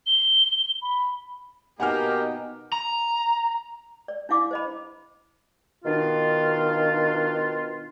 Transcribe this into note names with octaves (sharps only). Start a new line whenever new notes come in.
G7
B5
B2 A#3 D#4 G4 F#5 G#5 F6
A#5
D5
D4 E4 F5 D6
C5 D#5 B5
B2 D#3 D4 F4